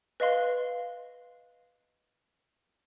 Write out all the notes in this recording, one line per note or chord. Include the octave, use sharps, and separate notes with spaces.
B4 D#5 F5 C6